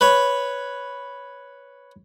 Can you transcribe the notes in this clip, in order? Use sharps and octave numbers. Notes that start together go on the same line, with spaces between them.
B4 C#5